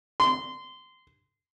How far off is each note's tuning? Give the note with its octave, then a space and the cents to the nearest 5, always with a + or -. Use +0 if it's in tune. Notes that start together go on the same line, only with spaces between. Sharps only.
C6 -20